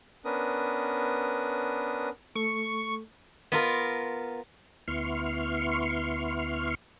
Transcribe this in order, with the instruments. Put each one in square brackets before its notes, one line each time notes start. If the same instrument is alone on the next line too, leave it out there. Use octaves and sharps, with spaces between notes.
[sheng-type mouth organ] B3 C#4 D4 A#4 B4 D#6
[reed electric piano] A3 A4 [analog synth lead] C#6
[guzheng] B3 F4 A#4
[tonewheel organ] D2 B3 E4 C6 C#6 F6